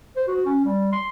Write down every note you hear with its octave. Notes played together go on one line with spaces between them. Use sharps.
C5
F#4
C#4
G3
C6